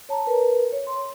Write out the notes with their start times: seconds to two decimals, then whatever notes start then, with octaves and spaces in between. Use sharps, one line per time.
0.09 C#5 A5 A#5
0.27 A#4 B4
0.72 C#5
0.87 C6